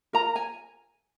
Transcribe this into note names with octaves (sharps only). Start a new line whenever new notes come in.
F4 A#4 A#5
G#5